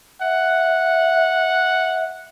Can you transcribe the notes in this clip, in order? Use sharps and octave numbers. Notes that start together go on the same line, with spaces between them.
E5 F#5